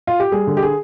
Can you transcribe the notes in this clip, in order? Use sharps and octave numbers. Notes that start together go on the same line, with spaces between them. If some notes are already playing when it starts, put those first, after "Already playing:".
F4
G4
G3 G#4
D3
G4
G#4